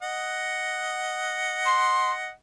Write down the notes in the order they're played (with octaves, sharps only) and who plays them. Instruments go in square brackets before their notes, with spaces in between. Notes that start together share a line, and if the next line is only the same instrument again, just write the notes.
[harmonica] D#5 F#5
[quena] C6